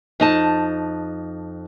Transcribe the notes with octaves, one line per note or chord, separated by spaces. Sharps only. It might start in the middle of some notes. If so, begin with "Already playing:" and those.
F2 D#4 A5